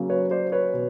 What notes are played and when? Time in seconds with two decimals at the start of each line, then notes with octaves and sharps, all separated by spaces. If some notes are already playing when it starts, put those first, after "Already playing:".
Already playing: C#3 F#3 A#3
0.09 B4 C#5
0.31 C5 D5
0.52 B4 C#5
0.74 B2